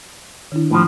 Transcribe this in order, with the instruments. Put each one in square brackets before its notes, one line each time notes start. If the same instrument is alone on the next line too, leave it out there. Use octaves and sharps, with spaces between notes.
[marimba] D#3 D4 E4
[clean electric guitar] A2 F3